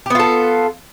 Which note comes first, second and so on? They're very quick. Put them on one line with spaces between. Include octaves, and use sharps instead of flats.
G4 B3 F4 A4